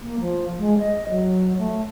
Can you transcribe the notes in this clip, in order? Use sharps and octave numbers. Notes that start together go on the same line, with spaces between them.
A#3
F3
G#3
D#5
F#3
A3